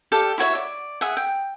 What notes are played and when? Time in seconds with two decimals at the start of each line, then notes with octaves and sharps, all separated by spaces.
0.12 G4 A4 D5 F5
0.38 E4 F#4 C#5 E5
0.55 D5
1.01 G#4 E5 F#5
1.17 G5